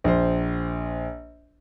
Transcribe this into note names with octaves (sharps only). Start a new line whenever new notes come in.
A#1 C5